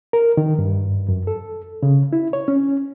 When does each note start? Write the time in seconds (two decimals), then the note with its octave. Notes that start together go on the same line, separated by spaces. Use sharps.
0.13 A#4
0.37 D#3
0.59 G2
1.08 F#2
1.27 A4
1.83 C#3
2.13 E4
2.33 C#5
2.48 C#4